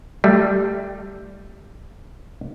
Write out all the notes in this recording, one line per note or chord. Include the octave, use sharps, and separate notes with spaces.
G3 A3